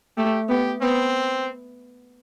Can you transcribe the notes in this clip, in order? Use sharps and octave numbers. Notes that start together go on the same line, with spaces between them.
A3 G4
B3 G4
B3 C4